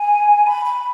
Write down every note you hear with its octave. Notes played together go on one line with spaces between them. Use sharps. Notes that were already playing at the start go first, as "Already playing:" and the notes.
Already playing: G#5
B5
B5